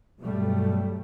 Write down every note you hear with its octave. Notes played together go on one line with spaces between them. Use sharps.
G2 B2 F#3 G3 A3